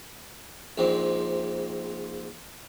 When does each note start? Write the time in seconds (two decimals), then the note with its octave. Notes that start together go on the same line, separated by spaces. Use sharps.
0.78 A#1 G#2 C4